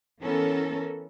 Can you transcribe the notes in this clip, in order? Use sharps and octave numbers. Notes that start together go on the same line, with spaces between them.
E3 B3 C#4 A4 A#4